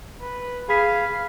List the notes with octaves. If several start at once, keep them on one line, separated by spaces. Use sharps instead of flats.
B4
G#4 F5 B5 B6